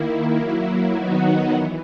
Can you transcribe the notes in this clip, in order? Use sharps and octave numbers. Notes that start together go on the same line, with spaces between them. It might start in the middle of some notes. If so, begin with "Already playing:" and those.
Already playing: D#3 A#3 E4
F#3 A#3 E4
D#3 F#3 B3 D#4 F#4
E3